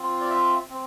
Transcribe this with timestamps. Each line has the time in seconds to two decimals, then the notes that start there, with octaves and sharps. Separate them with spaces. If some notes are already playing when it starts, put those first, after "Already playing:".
Already playing: C4 F4
0.21 D5
0.30 E5
0.70 C4